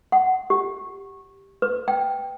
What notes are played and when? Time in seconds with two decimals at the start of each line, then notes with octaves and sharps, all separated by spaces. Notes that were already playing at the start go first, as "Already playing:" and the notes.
0.12 F#5
0.50 G4
1.62 B4
1.88 G5